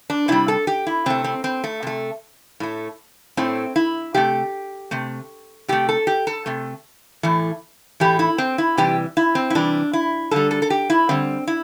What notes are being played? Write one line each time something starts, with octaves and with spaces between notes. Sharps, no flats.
D4
C3 G3 E4
A4
G4
E4
C3 A3 C4
C4
C4
A3
C3 A3
A2 A3
A2 A3 C4
E4
C3 A3 G4
C3 A3
C3 A3 G4
A4
G4
A4
C3 A3
A2 E3 A3
A2 E3 A3 G4
E4
C4
E4
C3 E3 G3 G4
E4
C4
E4
C3 E3 G3 D4
E4
D3 G3 A4
A4
A4
G4
E4
D3 G3 C4
E4